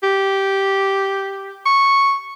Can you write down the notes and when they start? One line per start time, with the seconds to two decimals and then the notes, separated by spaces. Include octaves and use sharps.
0.03 G4
1.66 C#6